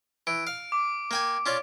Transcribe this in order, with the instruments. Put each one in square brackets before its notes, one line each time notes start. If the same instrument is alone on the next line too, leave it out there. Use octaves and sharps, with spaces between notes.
[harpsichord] E3 [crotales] D7
[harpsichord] F5
[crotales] D6
[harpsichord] A#3 G5 G#5
C#4 F4 D5